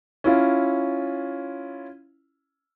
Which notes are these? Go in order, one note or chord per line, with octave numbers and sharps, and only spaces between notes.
C#4 E4 F4